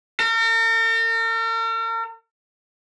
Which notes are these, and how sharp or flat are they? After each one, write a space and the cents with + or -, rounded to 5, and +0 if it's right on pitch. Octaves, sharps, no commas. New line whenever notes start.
A#4 -45